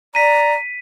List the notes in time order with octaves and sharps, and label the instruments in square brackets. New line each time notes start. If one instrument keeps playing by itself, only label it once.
[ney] D5 [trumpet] A#5 [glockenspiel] B6 D#7